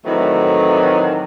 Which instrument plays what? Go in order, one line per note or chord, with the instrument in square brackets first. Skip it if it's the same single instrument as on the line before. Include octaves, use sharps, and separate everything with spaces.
[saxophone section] A2 D#3 E3 F#3 A3 C4